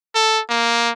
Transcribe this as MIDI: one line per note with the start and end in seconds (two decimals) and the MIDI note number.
0.15 0.41 69
0.50 0.92 58